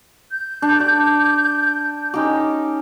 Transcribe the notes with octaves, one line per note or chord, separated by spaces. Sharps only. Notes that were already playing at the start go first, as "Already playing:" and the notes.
G6
D4
G4 D5
C#4 D#4 G4